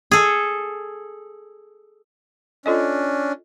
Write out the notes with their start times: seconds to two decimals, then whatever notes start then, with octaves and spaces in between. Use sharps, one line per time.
0.11 G#4 A4
2.66 C#4 D4 F4 A4 D#5